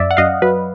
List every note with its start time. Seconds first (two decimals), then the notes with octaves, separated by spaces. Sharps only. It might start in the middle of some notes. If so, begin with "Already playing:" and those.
Already playing: F#2 D5 E5
0.11 F#5
0.17 F#2 D#5 F5
0.42 F#3 B4